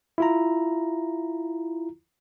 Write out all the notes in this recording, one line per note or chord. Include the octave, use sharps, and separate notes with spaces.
E4 F4 A#5